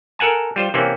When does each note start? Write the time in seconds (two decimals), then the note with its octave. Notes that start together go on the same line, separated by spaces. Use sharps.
0.19 A4 A#4 F#5 G#5 A5
0.56 G3 F4 C5
0.74 C3 E3 A#3 C4 C#4